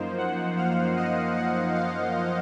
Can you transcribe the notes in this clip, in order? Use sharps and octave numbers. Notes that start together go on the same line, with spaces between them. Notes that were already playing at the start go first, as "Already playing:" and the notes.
Already playing: F#2 F3 A#3 D#4 C5
F#5
F5
D#5
F#5
F5